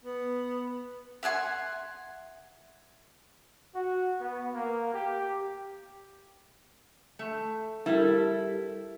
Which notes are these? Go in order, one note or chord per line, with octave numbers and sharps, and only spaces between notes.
B3
E5 F#5 G#5 C6
F#4
B3
A#3
G4
A3
G3 E4 G4 A4 A#4